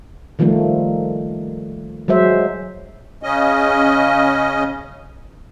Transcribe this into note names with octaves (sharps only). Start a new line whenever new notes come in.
D#3 F3 G3 A3 A#3
F#3 G#3 C5 E5
C#3 C#4 D#5